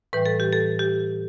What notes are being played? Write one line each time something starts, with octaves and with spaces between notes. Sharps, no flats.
A2 E3 G3 B4
A4
G4
A4
G4